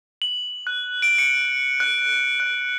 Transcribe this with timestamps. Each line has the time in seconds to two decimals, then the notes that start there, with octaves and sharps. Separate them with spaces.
0.22 F#7
0.67 F#6
1.02 D7
1.18 C#7
1.80 F#6
2.40 F#6